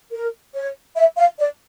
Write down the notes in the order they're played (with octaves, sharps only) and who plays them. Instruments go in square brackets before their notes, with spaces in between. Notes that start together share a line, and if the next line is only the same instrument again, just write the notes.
[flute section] A#4
C#5
E5
F5
D5